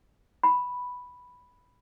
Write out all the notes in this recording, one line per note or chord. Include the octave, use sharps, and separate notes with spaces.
B5